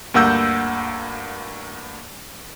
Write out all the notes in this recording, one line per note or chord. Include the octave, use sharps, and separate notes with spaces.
D2 G2 A#3 F#5 E6 G6